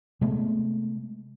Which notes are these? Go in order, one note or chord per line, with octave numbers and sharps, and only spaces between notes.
C3 G#3 A3 B3